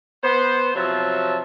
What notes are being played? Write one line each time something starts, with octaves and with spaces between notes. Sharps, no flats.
B3 C5
C3 F3 F#3 C#5 E5 A5